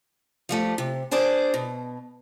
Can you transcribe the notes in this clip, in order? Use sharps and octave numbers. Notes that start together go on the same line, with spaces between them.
F3 G3 A3
C3
D4 G#4 C5 D5
B2